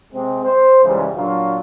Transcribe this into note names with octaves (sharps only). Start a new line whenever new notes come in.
C3 G#3 C4
C5
C#2 G#2 C#3 E3 G3
A#2 F#3 D4 F4